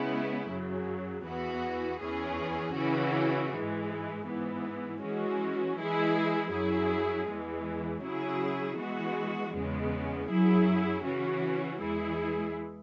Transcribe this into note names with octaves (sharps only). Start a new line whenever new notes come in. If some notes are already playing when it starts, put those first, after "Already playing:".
Already playing: C#3 G#3 B3 E4
F#2 C#3 F#3
E2 E3 B3 F#4
E2 E3 C#4 G#4
C#3 E3 C#4 F#4
G#2 E3 G#3
G#2 E3 B3
E3 G#3 C#4 F#4
E3 G#3 E4 G#4
F#2 F#3 E4 G#4
E2 E3 G#3
C#3 F#3 E4 G#4
E3 G#3 B3 F#4
E2 C#3 G#3 B3
F#2 F#3 E4 G#4
C#3 E3 C#4 F#4
E2 E3 G#3 E4 G#4